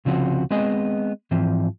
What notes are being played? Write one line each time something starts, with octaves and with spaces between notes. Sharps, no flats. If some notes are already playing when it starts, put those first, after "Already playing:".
C2 C#3 F3 C4 F#4
G#3 B3 C4 G#4 D#5
G#2 E3 F3 C4